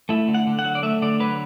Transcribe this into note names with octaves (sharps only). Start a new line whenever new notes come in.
A3 E4
D3
F#5
D3
F#5
F#3
D5
A3 E5
D3 D5
F#3 B4